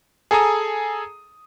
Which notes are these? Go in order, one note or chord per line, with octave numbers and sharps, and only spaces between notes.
G#4 A4 G#5 A#5 D#6